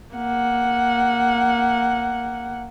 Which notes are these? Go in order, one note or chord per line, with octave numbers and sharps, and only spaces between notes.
A#3 F#5